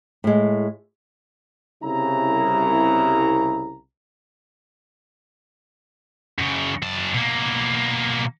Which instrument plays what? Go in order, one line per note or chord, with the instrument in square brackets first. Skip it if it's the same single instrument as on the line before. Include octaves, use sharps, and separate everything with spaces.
[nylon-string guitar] A2 G#3
[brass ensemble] C2 C#3 E4 A#5
[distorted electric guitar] F#2 C#3
F#2 A5
B2 A#3